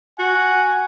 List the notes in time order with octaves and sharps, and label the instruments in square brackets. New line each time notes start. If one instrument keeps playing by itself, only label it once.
[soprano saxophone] F#4 [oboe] F#5 [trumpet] G#5